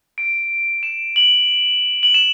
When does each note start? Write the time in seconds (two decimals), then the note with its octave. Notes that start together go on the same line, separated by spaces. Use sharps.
0.18 D7
0.83 E7
1.16 F#7
2.03 F#7
2.14 E7